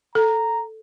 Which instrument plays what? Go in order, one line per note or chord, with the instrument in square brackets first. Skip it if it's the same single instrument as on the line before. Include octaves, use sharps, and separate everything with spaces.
[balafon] A4 [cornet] A#5